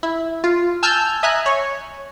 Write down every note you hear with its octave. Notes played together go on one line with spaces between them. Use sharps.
E4
F4
G#5 A5 E6 F6 G6
D#5 E5 G#5 A#5 F#6
C#5